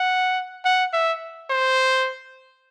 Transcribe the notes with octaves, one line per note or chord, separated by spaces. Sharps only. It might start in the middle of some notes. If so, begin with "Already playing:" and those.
Already playing: F#5
F#5
E5
C5